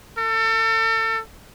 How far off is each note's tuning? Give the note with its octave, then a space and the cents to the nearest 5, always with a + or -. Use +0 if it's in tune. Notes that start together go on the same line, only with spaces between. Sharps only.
A4 +35